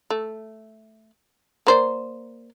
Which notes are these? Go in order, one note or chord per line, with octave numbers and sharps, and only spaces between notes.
A3
A#3 C5 D5